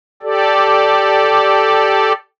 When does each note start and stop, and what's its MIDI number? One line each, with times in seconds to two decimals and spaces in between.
0.23 2.13 67
0.23 2.13 69
0.23 2.13 74